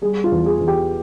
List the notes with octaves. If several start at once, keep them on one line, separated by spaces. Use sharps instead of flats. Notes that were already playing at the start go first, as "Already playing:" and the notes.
G3 G#4
F4
E2
G#4
E2
G4